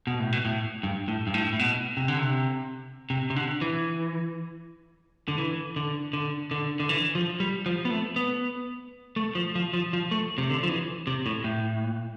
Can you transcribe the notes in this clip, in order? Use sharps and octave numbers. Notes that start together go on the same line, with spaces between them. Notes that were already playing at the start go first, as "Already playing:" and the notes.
B2
A2
B2
A2
G2
A2
G2
A2
A2
B2
C3
D3
C3
C3
C3
D3
E3
D3
E3
D3
D3
D3
D3
E3
F3
G3
F3
B3
A3
B3
A3
F3
F3
F3
F3
A3
C3
D3
F3
E3
C3
A2
A2